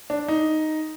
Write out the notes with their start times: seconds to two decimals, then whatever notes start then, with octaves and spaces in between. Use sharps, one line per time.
0.10 D4
0.28 D#4